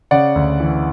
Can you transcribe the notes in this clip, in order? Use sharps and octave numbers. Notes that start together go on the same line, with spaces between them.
C#3 D5 F#5
D2
E3